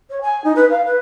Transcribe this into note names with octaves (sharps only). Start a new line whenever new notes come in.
C#5
G#5
D#4
B4
F5
B4